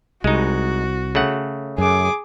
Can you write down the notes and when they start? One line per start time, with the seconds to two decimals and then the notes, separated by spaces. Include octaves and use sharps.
0.24 C2 G#3 D#4 F#4
1.15 C#3 A3 F#5
1.78 F#2 G#4 D6